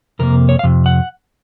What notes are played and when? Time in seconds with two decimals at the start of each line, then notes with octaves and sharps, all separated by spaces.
0.19 F2 C3 A#3 A#4
0.49 C#5
0.59 F5
0.63 F2 C3
0.86 F#5